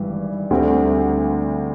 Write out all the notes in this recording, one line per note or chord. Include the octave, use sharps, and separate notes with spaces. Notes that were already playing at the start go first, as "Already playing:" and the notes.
Already playing: G#1 G2 E3 G3
D2 D3 G3 C4